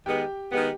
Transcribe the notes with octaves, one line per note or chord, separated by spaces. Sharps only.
D#3 G#3 B3 G4 G5
D#3 G#3 B3 G4 G5